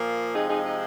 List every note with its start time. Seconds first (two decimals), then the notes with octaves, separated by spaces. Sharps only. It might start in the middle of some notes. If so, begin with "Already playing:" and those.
Already playing: A#2 F3 A#3
0.34 C3 F3 G#3 C4 D#4 G#4
0.50 D#4 G#4
0.65 D#4